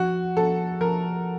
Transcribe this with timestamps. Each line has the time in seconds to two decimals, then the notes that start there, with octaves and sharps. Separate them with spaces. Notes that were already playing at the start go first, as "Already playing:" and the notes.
Already playing: F3 F#4
0.37 F3 A4
0.81 F3 A#4